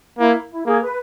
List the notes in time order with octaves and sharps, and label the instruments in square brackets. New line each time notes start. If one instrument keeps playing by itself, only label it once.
[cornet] A#3 [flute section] E4
[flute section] E4
[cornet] A#3 [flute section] G#4
[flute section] B4